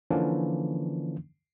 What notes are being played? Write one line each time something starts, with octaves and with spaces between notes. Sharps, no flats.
D3 E3 F3 A#3 C#4 D4